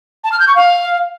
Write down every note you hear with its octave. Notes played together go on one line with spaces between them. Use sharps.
A5
F6
G6
C#6
F5